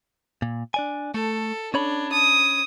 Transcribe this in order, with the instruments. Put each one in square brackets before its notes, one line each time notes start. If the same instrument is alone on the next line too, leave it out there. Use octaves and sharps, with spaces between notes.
[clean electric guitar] A#2
D4 D5 G#5
[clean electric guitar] A3 [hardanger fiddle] A4
[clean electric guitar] C#4 C#5 B5 [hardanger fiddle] D4
[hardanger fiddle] D#6